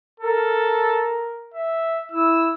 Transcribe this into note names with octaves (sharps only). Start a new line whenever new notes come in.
A4 A#4
E5
E4 E6